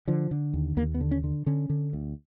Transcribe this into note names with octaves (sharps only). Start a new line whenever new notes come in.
D3 F3
D3
D#2
D#2 A#3
B3
D3
C#4
D3
D3 C#4
D3
D2